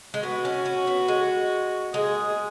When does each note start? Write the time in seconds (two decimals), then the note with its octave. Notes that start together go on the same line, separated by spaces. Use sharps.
0.14 G#3
0.23 B3 F#4
0.45 C#4
0.65 C#4
0.87 B3
1.08 G#3
1.94 G#3 G#4